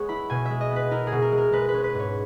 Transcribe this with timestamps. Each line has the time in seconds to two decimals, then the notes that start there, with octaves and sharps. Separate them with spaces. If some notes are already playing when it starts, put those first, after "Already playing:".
Already playing: G#3 B3 C#5
0.09 E4 B5
0.30 B2 G#5
0.45 E5
0.50 G#3
0.61 D#5
0.71 B3
0.76 B4
0.91 E4 A#4
1.07 G#4
1.12 B2
1.22 A#4
1.32 G#3
1.37 A#4
1.52 G#3 B4
1.69 B4
1.74 C#4
1.84 B4
1.94 G#2 C#5